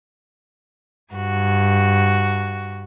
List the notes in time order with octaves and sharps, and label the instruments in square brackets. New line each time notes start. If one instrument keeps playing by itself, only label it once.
[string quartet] G2 F#4